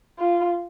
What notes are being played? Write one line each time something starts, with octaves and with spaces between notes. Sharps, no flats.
F4